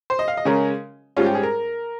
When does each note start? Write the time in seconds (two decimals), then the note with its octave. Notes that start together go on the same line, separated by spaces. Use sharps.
0.10 C5
0.19 D#5
0.28 F5
0.37 D#5
0.45 C#3 G#3 C#4 A#4
1.17 G#2 G3 C#4 F4
1.26 G4
1.35 G#4
1.43 A#4